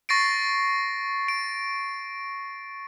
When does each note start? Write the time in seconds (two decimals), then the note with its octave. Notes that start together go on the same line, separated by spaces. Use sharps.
0.09 C#6 A6 A#6 C7 D7
1.28 D7